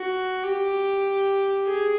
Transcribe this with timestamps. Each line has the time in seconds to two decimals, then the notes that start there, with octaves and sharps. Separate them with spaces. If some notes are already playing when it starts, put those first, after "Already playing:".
Already playing: F#4
0.43 G4
1.67 G#4